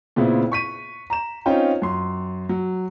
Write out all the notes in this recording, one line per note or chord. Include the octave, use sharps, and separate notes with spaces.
A#2 C#3 B3 C4 E4
C#6 B6 D#7
A#5 E7
C4 C#4 D#4 F4 C#5 G5
F#2 C6
F#3